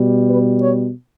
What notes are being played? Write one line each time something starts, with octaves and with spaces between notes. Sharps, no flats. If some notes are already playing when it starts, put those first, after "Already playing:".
Already playing: B2 G3
B4
C#5